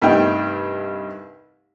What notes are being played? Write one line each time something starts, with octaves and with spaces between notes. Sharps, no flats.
C2 G2 A3 D#4 G5